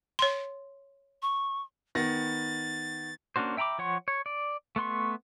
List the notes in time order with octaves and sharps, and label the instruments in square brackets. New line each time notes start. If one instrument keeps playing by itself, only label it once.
[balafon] C#5 C6
[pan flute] C#6
[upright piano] D#3 B3 A#6 [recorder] A6
[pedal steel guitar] A#3 C#4 D4 F#4 C5
E5 G5 A#5 B5 D6
F3 C#5 F#5 C6 C#6
C#5
D5
A3 B3 C6 C#6